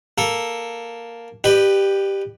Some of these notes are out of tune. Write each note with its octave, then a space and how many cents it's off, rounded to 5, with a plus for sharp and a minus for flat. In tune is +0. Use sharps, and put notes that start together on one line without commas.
A#3 +0 A4 +0
G4 +0 B4 +0 D5 +40